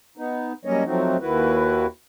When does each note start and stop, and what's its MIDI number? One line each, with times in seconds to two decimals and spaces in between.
0.18 0.53 59
0.18 0.53 63
0.65 0.84 54
0.65 0.84 55
0.65 0.84 58
0.65 0.84 61
0.65 0.84 73
0.65 0.84 75
0.85 1.17 53
0.85 1.17 54
0.85 1.17 57
0.85 1.17 60
0.85 1.17 63
0.85 1.17 66
1.21 1.86 39
1.21 1.86 51
1.21 1.86 64
1.21 1.86 66
1.21 1.86 71